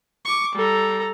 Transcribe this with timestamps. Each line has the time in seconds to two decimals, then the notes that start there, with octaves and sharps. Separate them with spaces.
0.25 C#6 D6
0.56 G3 A4 A#5